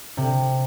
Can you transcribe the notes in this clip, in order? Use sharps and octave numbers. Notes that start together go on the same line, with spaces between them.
C3